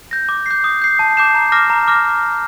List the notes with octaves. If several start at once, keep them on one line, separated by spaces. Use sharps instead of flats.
G6 A#6
D6
G6 C7
D#6
G6 C7
A5
D6 G6 C7 E7
A#5
D6 F6 A#6
A#5
D6 F6 A#6